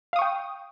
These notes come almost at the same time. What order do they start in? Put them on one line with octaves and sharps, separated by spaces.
F5 D#6 C#6 G5